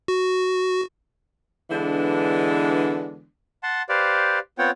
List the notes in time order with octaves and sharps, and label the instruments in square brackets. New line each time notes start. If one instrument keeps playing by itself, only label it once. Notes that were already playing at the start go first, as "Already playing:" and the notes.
[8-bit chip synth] F#4
[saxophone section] D3 E3 G#3 B3 D4
[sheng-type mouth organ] F#5 A5 C6
G4 B4 C5 D5 F5
B3 C4 F4 C#5 F#5 G5